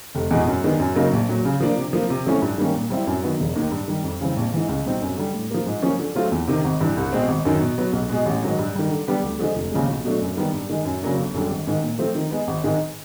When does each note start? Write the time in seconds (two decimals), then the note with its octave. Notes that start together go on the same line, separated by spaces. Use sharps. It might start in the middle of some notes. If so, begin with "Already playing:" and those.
0.15 F1
0.31 E2 B2 G#3
0.47 F#2
0.64 D#3 G#3 B3 D4
0.80 F#2
0.96 C#3 F#3 A#3 D#4
1.13 A#1
1.29 A#2 F#3
1.45 C#3
1.60 F3 A#3 D4
1.78 C3
1.93 F3 A#3
2.10 C3
2.26 F3 A3 C#4 E4
2.42 G2
2.58 D#3 G3 A#3 C#4
2.75 A#2
2.90 G3 C4 E4
3.07 F#2
3.24 D#3 F#3 B3
3.40 E1
3.56 D#2 D#3
3.71 G2
3.88 D#3 G3
4.04 F2
4.21 C#3 E3 G3 C4
4.37 A#1
4.53 G#2 E3
4.69 C#2
4.86 B2 G3 C4 D#4
5.02 F#2
5.17 D3 G3
5.34 A2
5.51 F3 A#3
5.66 G#2
5.83 F3 A#3 C#4
5.99 D3
6.15 F#3 A3 C4 F4
6.32 E2
6.48 C3 D#3
6.64 G#1
6.81 G2 E3
6.97 C2
7.13 B2 G#3 C4
7.28 G#1
7.45 F#2 D#3
7.61 B2
7.78 F#3 B3
7.93 B1
8.09 B2 G#3
8.26 A1
8.42 G#2 D#3 F#3
8.59 G2
8.75 D#3 G3
8.90 D3
9.08 G3 B3 D4 G4
9.23 D2
9.39 D3 F3 G#3
9.55 F1
9.72 D#2 C#3 F3 G#3
9.88 B1
10.04 B2 F#3 A3 D4
10.21 F#2
10.37 D#3 G3 B3
10.54 G2
10.70 D#3 G#3
10.85 F#2
11.03 C#3 F#3 A#3 D4
11.18 G1
11.34 F#2 D3 G3
11.50 G#1
11.67 G#2 D#3
11.83 A#2
11.99 F3 A3 C4
12.15 D#3
12.31 G#3 B3
12.47 G#1
12.64 G#2 D#3 G#3